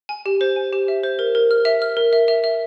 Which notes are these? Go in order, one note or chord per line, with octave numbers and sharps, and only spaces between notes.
G#5
G4
C5
G#5
G4
E5
C5
A#4
A#4
F6
E5
F6
A#4
E5
E5
E5